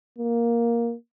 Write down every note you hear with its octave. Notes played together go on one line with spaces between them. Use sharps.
A#3